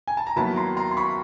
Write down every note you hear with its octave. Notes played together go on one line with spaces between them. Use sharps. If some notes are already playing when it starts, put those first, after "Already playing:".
G#5
A5
A#5
D#2 D#3 F#3 B3 E4 A5 B5
A#5 C6
A#5 C6
C6
B5 C#6